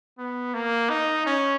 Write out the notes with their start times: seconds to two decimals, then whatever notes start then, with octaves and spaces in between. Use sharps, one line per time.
0.19 B3
0.54 A#3
0.90 D#4
1.26 C#4